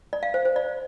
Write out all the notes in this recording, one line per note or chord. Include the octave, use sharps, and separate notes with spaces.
D5
F5
C5
C5
D5